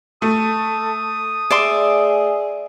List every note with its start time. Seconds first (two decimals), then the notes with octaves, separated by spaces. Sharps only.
0.22 A3 A4 D#6
1.51 G#4 D5 E5 C6